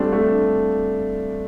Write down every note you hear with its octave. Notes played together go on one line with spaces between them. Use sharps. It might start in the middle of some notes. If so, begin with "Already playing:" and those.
Already playing: G3 A3 C4 D4 F4
A3 D4